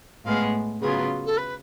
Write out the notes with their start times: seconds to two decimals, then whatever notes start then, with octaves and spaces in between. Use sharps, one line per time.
0.25 A2 G#3 B3 F5
0.81 C#3 F#3 B3 F4 G#4
1.25 A4
1.37 B4